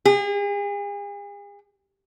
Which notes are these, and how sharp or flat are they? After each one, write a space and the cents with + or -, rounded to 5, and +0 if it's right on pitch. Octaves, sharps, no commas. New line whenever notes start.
G#4 -40